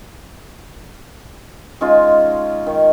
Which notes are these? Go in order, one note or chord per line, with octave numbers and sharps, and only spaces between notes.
G#3 C#4 D#4 F4
D#3